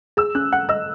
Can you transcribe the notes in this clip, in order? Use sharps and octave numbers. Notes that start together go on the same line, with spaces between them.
G#4 E6
C#4 F#6
F#5 F#6
D#5 E6